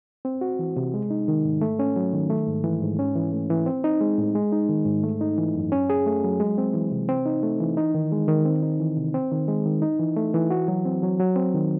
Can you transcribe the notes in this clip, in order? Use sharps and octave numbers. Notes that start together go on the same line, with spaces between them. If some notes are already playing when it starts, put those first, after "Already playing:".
C4
F#4
E3
C3
G#3
D#4
D#3
G#2
A3
C#4
F#3
D#3
A3
G#2
E3
G#2
C#4
E3
A3
E3
C4
D#4
G#3
A2
G#3
D#4
D#3
G#2
A3
D#4
E3
F#2
C#4
G#4
A3
F#3
G#3
C4
E3
C3
C4
D#4
A3
E3
D#4
D#3
G#3
D#3
C4
D#4
E3
C3
C4
D#3
G#3
D#3
D#4
E3
A3
E3
F#4
F#3
C4
F#3
F#3
C4
D#3